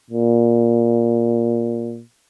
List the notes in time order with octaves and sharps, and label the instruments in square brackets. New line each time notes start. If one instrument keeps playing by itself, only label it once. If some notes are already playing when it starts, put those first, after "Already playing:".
[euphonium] A#2